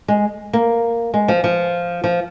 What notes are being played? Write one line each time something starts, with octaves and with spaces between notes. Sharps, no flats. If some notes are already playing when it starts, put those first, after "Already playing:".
G#3
A#3
G#3
F3
F3
F3